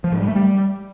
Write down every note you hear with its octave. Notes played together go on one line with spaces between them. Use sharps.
F3
G#2
G3
A3
G3